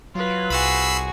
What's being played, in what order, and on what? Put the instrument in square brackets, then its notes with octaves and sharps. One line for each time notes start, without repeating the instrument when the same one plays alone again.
[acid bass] F#3 [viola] F4 B4
[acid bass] C2 [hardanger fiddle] F#4 G#4 [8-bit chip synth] B5 E6 C7